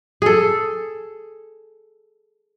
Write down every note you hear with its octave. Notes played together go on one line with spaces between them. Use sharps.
G#4 A4